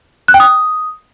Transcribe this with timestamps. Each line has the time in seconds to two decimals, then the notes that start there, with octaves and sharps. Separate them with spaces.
0.28 F#6
0.34 G5
0.40 D#6